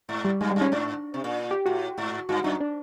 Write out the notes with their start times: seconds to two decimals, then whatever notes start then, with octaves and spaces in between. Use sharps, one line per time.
0.09 G#2
0.25 G3
0.41 G2 G#3
0.51 G3
0.56 G2
0.61 C#4
0.72 G#2 D4
1.14 C3
1.24 A#2
1.51 G4
1.66 A2 F#4
1.98 G#2
2.29 G2 F#4
2.44 F#2 D#4
2.60 D4